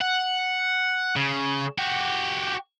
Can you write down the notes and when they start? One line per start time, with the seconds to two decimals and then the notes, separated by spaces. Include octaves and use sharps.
0.01 F#5
1.16 C#3
1.78 F#4 G4